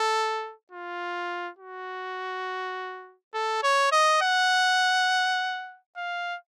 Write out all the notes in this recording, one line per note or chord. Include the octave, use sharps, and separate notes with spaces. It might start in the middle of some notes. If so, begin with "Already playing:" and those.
Already playing: A4
F4
F#4
A4
C#5
D#5
F#5
F5